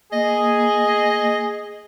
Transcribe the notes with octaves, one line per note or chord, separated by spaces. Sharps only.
A#3 G#4 D#5